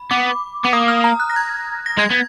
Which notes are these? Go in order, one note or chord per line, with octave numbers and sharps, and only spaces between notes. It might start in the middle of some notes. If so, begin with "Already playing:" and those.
Already playing: B5
B3 D6
B3 D6
A#3 D#6
F6
A#5
F#6
A#6
G#6
A#6
G#3 G#6
B3